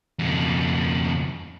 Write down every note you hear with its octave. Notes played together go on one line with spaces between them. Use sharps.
F2 C#3